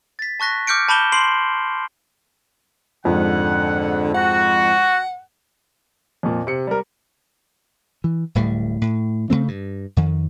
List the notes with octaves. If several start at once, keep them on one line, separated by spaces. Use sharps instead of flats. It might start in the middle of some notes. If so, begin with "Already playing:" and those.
A6 B6
A5 C#6 F#6 A#6 B6
D6 F6 G6 C#7 D7
A5 B5 D6 G6 E7 G7
C6 C7 D7 F#7
F2 G#2 D3 F#5
F#4 F#5
F2 A#2
C3 C#7
G3 A#4
E3
D1 A2 G3
A2
C#3 E3 A3 C4
G2
F2 D#3